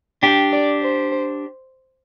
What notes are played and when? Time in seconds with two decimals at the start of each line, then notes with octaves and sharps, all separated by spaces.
0.23 D4 G4 G5
0.53 D5
0.81 C5